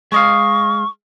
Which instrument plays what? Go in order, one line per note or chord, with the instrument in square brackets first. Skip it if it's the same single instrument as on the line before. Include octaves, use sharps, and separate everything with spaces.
[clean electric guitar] G#3 D#5 F5 [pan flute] C#6